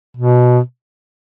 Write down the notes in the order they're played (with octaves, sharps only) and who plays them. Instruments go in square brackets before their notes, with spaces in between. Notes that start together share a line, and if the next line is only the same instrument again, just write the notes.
[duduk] B2